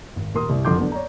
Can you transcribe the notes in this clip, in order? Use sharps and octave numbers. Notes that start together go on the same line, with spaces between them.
G#1
D#1 A#4 C6 D#6
C2 G2
F#1 F2 D3 C6 D6 G6
D3 F#3 B3 D4
C#5 D5 A#5